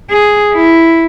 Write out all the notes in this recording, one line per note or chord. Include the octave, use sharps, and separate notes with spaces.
G#4
E4